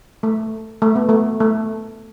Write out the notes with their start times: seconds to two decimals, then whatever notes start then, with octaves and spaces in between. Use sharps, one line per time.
0.23 A3
0.82 A3
0.95 B3
1.09 A3
1.40 A3